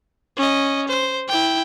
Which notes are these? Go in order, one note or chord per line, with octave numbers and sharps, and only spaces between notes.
C#4 D#5
C5
E4 G5